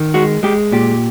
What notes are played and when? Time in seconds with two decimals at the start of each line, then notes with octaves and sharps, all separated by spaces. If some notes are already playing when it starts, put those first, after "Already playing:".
Already playing: D#3
0.14 G#3 F#4
0.43 G#3 G4
0.72 A#2 G4